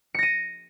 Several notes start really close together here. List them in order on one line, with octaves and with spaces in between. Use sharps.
C#7 A#6 D#7